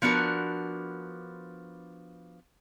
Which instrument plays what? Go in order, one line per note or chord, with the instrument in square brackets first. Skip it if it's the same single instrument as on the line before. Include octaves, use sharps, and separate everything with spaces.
[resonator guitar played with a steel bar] F3 B3 D4 F#4 A#4